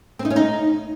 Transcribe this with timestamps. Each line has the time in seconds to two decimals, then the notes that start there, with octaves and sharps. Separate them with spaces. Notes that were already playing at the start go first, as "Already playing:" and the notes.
0.19 C4
0.25 D#4
0.30 C#4
0.36 D#4